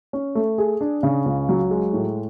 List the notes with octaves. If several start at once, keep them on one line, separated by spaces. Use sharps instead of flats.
C#4
A3
G#4
D4
C#3
C#2
F#3
G#3
A2